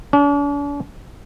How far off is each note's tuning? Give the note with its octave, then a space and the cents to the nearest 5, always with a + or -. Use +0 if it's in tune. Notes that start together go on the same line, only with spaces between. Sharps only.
D4 -45